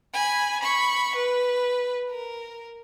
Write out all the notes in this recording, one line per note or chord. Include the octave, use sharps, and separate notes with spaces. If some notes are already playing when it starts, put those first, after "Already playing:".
G#5 B5
B5 C#6
B4
A#4